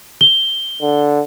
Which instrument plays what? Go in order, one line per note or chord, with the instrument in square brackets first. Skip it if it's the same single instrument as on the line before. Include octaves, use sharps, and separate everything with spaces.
[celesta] G7
[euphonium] D3